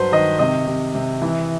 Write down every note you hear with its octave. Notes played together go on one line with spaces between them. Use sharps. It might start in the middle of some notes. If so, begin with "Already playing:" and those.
Already playing: G2 F#3 B4 C5
D#3 D#5
C3 D#5
C3
C3
E3